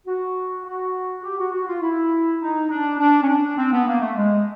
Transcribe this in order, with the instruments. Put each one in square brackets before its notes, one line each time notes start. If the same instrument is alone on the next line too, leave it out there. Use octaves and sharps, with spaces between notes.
[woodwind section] F#4
F#4
G4
F#4
F#4
F4
E4
D#4
D4
D4
C#4
D4
C4
B3
A#3
A3
G#3